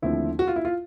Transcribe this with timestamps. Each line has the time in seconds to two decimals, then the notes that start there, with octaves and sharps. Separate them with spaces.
0.02 D#2 D3 F3 A3 C4 E4
0.39 F#4
0.48 F4
0.56 E4
0.65 F4